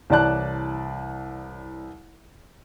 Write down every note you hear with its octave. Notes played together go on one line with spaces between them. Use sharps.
C2 E3 C#5 D5 A5 F#6